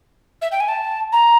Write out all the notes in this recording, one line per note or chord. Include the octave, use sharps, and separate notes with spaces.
E5
G5
G#5
A5
A#5